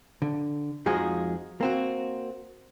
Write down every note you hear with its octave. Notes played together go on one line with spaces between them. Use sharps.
D3
F2 F3 G#3 D#4 F#4 G#4
A#3 C4 F#4